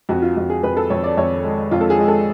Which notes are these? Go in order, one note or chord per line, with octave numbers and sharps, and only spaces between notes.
F2 F#4
F4
F2 F#4
G#4
F2 B4
A4
F2 C#5
D5
F2 C#5
G#3
F2 F4
A4
G#4
G#3
A4